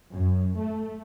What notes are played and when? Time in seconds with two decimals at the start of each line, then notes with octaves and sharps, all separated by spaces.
0.13 F#2
0.60 A3